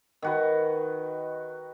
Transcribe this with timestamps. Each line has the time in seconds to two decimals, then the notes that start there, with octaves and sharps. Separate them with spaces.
0.22 D#3 F#4 B4